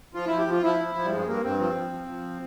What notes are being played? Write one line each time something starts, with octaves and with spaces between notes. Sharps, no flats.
F3 F4
F3 E4
G4
F3 F4
F3 E4
F3
F3
G3
G2 G#3
G2 A#3
G2 C4
F3 C4
F3
F3
F3